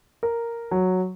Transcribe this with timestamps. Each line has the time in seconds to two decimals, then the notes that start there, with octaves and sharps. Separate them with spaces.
0.23 A#4
0.71 F#3